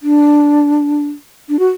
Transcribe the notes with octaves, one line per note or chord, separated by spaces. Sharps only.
D4
D4
F#4